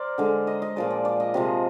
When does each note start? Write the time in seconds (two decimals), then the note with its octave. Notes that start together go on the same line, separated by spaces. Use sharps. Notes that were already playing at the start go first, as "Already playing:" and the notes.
Already playing: A#4 C5 D5
0.18 D3 G#3
0.47 D#5
0.62 D#5
0.76 A#2 F3 G#3 D5
0.90 D5
1.05 D5
1.20 D#5
1.34 C3 F3 G#3